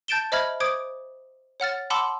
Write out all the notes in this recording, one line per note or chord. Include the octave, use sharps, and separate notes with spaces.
A5 G6 A6 D7 E7 G7
C5 D#5 E5 B5 F6 G#6
C5 D6 D#6 G#6 D7
C#5 F#5 F6 A6
F#5 A5 B5 C6 D6 E6